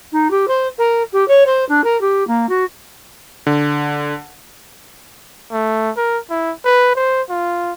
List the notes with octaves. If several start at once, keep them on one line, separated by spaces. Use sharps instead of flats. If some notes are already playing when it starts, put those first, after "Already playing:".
D#4
G4
C5
A#4
G4
C#5
C5
D4
A#4
G4
A#3
F#4
D3
A3
A#4
E4
B4
C5
F4